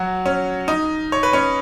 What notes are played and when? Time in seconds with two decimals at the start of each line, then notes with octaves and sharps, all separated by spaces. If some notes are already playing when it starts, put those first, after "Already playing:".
Already playing: F#3 F#4
0.26 C#4
0.68 D#4
1.12 C#5
1.23 B4
1.33 C#4 C#5